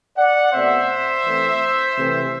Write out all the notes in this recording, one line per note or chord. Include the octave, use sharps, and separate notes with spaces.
D5 F#5
B2 A3 C4 C5 E5
E3 A3 C4
C3 E3 A3 C4